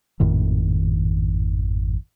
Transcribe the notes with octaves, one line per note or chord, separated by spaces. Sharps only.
G#1 F2 A2 D#3